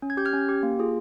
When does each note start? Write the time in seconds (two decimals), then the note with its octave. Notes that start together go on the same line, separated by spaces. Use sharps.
0.02 C#4
0.10 G#6
0.17 G4 G6
0.25 F6 G#6
0.33 C#4
0.49 G4
0.63 A#3
0.79 F4 G#4